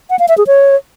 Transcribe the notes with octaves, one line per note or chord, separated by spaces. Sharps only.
F#5
F5
E5
G#4
C#5